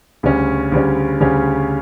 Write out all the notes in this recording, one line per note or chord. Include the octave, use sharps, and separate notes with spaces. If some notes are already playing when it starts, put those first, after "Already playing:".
D2 C#3 G3 C#4
D2 C#3 G3 C#4
D2 C#3 G3 C#4